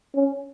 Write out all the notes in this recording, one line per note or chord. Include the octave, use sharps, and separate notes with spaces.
C#4